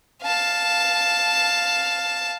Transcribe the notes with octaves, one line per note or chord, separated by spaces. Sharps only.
F5 A5